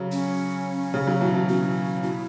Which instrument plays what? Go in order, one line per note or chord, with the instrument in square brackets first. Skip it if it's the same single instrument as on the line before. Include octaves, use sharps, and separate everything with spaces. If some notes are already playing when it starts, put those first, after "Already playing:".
Already playing: [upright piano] C#3 F#3
[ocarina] C#4
[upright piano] C#3
C#3 F#3
B2 E3
B2
[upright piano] B2 [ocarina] C#4
[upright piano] B2 [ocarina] E4